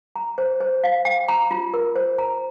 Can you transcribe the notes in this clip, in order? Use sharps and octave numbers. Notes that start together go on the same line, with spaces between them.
A#5
C5
C5
F5
G5
A#5
F4
A#4
C5
A#5